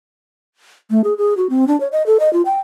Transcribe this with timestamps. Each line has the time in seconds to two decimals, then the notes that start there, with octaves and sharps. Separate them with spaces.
0.91 A3
1.04 G#4
1.18 G#4
1.37 F#4
1.50 C4
1.68 D4
1.80 C#5
1.92 D#5
2.06 A4
2.20 D#5
2.33 F4
2.45 G5